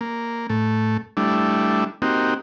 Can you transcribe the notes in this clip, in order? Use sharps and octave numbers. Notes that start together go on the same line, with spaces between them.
A#3
A2 A3
G3 A3 D4 E4
A#3 C4 D#4 F#4 G4